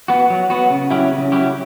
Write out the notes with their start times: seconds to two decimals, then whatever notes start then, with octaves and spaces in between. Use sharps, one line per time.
0.08 B3 F#4
0.30 F#3
0.50 B3 F#4
0.70 C#3
0.90 F#3 C#4 E4 G4
1.12 C#3
1.32 F#3 C#4 E4 G4